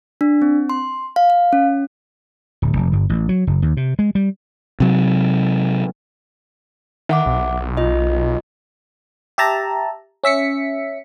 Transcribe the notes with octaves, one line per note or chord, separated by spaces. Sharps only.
D4
C4
C6
F5
F5
C#4
D1
F1
G1
A1
F#3
F#1
D#2
C3
G#3
G3
C3 F#3
D#3 E5 F#5 D6
B1
F4 D#5
G4 E5 A5 A#5
C#4 E5 B6 C#7